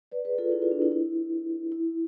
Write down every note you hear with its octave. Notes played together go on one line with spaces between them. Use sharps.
B4 D5
G#4 B4
F4 A4
E4 G#4
F4
D4
E4
E4
E4